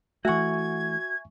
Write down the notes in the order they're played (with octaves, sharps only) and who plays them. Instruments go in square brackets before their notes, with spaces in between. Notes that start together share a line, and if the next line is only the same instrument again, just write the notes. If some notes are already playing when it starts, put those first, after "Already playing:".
[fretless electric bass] E3 A3 [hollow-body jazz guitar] F#4 F#5 [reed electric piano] E5 G#5 C#6 [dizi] G#6